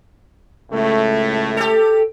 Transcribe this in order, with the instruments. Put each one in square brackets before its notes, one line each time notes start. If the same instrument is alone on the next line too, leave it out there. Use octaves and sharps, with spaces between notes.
[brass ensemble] C#2 A2 A3
[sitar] G4 A4